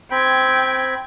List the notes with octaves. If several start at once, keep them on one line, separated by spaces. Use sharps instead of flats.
C4 G5 B5 G#6